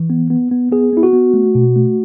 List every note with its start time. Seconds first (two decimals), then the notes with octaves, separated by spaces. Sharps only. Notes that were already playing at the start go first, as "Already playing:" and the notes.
Already playing: E3
0.10 B3
0.30 B3
0.51 B3
0.72 B3 G#4
0.93 B3 E4
1.03 F#4
1.13 B3
1.34 A3
1.55 B2
1.76 A3